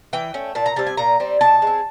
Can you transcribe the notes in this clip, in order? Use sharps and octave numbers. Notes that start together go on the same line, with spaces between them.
E3 G5
A3 C#4
A#2 A5
A#5
G3 C4 A5
G#5
A#2 A#5
G3 C4
B2 A5
G#3 C4